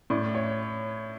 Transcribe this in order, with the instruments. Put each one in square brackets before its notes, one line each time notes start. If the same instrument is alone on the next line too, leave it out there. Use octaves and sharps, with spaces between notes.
[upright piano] A2 D5
C#5